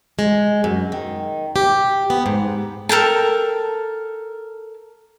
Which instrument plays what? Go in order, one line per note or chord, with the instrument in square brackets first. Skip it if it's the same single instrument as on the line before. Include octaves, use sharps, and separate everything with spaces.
[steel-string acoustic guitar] G#3
F#2
D#3
G4
B3
G#2
[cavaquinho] A4 A#4 G5 A5